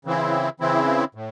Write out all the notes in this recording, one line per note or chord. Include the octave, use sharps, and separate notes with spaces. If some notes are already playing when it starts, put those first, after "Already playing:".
C#3 E3 C4 E4
C#3 E3 C4 E4
A2